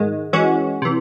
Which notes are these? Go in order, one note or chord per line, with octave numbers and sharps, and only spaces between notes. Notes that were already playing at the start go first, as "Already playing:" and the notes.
Already playing: G#2 D#3 G#3
E3 G#3 C#4 F#4
C3 E3